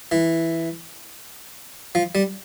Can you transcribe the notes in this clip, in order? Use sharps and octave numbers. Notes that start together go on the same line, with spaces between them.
E3
F3
G3